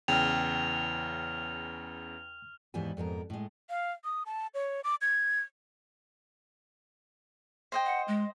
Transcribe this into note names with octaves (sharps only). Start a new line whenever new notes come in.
E2 C#3 G5 F6 F7
D#2 G#2 E3 G3 B3 G#5
F2 G#2 B3 A#4
A2 G#3
F5
D#6
A5
C#5
D6
G#6
C5 D#5 G5
F#5
G#3